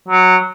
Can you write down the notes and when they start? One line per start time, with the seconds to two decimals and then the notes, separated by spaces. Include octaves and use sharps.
0.08 F#3